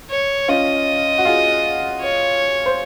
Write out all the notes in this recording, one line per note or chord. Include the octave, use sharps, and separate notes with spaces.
C#5
C#4 F4 D#5
F#4
F4 G#4
C#5
C5